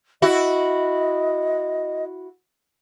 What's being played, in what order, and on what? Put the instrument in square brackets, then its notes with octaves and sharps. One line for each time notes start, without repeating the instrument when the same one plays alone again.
[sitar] E4 F#4 [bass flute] D#5